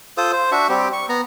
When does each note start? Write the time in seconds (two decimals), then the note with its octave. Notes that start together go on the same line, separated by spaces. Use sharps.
0.17 F4 A4 C5 D#6
0.32 C5
0.52 D4 F#4 E5 C#6
0.69 G3 C4 G4
0.93 C#6
1.09 B3 A#5